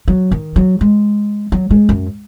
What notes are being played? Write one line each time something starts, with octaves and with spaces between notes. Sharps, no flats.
F#3
D#3
F#3
G#3
F#3
G#3
F#2